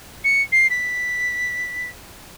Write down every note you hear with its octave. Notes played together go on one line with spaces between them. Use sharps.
C#7
C7
B6